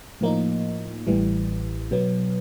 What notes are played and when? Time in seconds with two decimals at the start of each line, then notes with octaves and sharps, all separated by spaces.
0.21 A2 F3 A#3 D#4
1.07 A1 A2 E3 G3
1.91 B2 F#3 B3